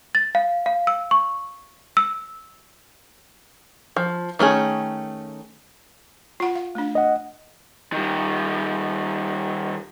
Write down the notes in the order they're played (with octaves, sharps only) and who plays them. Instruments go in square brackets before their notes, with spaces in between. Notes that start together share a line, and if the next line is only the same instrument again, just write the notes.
[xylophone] A6
F5
F5
E6
C#6
E6
[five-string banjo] F3
D#3 A3 C#4 G#4
[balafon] F4 F#5
F5
A3 D4
[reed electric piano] D#5 F#5
[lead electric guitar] D#3 G3